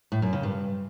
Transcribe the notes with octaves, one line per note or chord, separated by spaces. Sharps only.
A2
F#2
C#3
G2